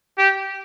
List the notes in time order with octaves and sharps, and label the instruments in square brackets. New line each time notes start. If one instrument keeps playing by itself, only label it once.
[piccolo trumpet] G4